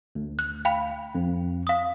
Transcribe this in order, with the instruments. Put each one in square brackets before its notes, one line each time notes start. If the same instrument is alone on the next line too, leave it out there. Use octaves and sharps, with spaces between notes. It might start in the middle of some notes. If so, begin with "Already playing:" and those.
[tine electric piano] D2
[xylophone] F#6
F5 G5 B5
[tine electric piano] F2
[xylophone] F5 D#6